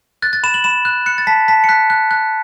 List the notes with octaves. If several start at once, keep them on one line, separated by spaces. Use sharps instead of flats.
F#6 A6
A6
B5 E7
F#7
B5 E7
F#6
F#6 C#7
A6
A5 B6
A5 B6
C#7
F#6 B6
F#6
F#6